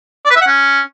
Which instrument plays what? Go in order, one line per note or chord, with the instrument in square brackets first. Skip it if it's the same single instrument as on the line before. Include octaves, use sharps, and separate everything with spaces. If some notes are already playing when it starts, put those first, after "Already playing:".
[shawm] D5
B4
E5
F#5
C#4